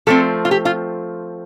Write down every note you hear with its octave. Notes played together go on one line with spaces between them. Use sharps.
F3 A3 C4 A4
F4
G4
F4